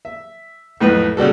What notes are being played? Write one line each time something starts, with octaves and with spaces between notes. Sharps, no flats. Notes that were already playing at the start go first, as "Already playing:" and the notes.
E5
B1 F2 A2 B4
C#3 G3 F#4 A4